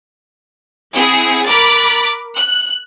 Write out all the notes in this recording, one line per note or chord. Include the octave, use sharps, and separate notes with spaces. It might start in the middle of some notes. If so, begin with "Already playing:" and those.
C4 E4 G#4 F#5
A#4 B5 D6 F#6 A6
F#6